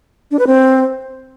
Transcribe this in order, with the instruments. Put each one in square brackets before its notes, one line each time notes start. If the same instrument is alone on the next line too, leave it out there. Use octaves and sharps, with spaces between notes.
[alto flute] D4
B4
C4